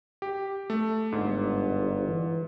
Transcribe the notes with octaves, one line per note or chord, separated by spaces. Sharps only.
G4
A3
G1 G#2
E3